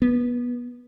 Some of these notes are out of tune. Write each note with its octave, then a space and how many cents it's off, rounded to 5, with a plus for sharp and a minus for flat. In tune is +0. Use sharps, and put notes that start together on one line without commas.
B3 -20